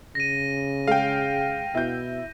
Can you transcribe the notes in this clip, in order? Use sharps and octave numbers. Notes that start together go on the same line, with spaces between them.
C#3 A#6 D#7
G#3 F5 G5
B2 E4 G6